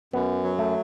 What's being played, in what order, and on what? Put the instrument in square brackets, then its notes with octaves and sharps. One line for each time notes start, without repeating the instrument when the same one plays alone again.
[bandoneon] F#2 [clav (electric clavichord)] B3
[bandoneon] F#3
[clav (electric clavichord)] A3